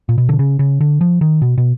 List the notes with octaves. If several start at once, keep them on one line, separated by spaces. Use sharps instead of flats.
A#2
B2
D3
C#3
C#3
D3
F3
D#3
B2
B2